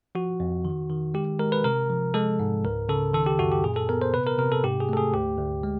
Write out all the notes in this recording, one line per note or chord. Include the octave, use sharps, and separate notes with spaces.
F3 F#4
F2
D#3
D#3
G#3 G4
G#3 A#4
B4
C3 A#4
F3
G#3 A4
G#2
C#2 A#4
C#3 A4
D#3 A4
G4
F#2 F#4
G4
A#2 G#4
A4
B3 A#4
C5
C3 B4
A#4
C3 A#4
A4
G#2 G4
G#4
A3 A4
G#4
D2 G4
D2
G#3